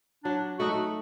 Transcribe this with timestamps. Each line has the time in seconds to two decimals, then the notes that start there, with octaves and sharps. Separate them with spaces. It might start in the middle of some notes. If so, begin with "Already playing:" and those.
0.24 F#3 D4
0.59 A3 D#4 F#4